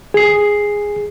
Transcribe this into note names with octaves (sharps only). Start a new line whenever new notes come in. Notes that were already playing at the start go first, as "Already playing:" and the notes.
G#4 C7